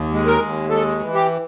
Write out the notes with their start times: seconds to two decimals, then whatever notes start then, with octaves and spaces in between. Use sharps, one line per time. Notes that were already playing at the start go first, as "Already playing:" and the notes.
Already playing: D#2
0.13 G#3
0.27 A#4
0.42 D#2
0.70 G#3 A4
1.00 E3
1.14 G4